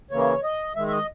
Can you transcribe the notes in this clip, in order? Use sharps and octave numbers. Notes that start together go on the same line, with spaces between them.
C#3 E3 A#3 C#5
D#5
D#3 G#3 E5
E5
D#5